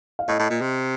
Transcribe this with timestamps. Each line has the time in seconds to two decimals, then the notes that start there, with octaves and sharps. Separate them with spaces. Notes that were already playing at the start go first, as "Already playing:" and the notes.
0.19 F5
0.28 A2 D#5
0.39 A2
0.50 A#2
0.61 C3